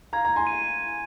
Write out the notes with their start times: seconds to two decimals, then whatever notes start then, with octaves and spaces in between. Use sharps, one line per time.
0.13 F5 A#5 G#6
0.25 A#5
0.36 G#5 C6
0.47 D#7